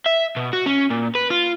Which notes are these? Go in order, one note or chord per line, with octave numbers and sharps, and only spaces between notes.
E5
B2
F#4
C#4
A#2
B4
F4